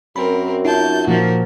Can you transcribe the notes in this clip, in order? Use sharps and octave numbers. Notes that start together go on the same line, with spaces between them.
F#2 C4 A#4 B5
D#4 F4 E5 A5 G6
A#2 F3 F#4 A#4